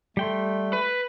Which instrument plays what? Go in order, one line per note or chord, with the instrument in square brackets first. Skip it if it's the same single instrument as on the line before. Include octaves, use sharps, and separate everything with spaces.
[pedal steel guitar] G3 G5 C6 [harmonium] A3
[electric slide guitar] B4